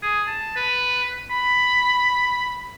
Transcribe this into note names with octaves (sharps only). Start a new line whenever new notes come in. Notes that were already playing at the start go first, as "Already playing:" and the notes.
G#4
A5
B4
B5